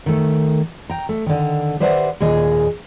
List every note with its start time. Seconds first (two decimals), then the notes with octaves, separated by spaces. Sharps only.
0.06 D#3 A3
0.90 G5 A#5
1.09 A3
1.26 D3 D#3
1.80 G4 B4 C5 D5 E5 F#5
2.21 D#2 A#2 G#4 D#5